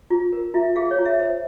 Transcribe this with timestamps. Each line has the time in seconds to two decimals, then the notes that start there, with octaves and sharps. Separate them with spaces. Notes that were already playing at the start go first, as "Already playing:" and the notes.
0.10 F4
0.33 A#4
0.54 F4 E5
0.76 G#4 F5
0.91 C#5
0.98 F4
1.05 E5
1.19 C5 E5